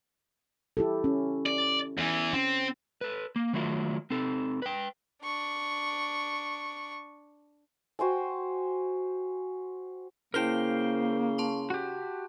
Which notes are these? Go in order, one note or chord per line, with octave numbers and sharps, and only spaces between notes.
E4 G4 A4
C#4
D5
E2 E3
C4 C#4
A4 B4
A#3
D#3 F#3 A3 E4 F4 A#4
C4 D#4 A4
B4 G5
D4 C#6
F#4 C5 G5 G#5
C#3 A#3 E4 A#4 C5 G5 C7 G7
A5 C6 C#6
F#4 G4